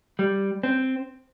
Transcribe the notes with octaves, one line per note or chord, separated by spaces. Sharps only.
G3
C4